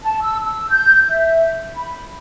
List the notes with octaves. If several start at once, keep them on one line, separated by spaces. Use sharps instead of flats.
A5
E6
E6
G6
E5
B5